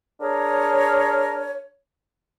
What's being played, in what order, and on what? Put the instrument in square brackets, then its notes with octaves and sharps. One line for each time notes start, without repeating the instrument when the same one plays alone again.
[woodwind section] D4 G#4 A#4 C#5